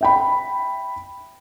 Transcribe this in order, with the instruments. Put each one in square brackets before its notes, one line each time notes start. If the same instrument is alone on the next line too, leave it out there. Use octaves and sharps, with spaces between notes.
[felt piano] E5 G5 B5